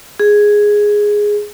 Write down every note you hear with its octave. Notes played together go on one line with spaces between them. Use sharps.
G#4